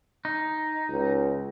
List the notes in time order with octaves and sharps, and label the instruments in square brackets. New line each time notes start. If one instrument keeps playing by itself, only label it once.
[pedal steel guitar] D#4
[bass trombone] C#2